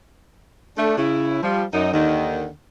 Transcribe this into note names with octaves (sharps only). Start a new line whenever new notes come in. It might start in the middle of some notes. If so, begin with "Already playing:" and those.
A3 D4
C#3 E4
F3 G3
F#2 D#4
D#2 D3 D#3